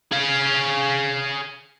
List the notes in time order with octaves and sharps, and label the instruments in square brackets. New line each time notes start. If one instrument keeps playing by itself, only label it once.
[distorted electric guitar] G#4 F5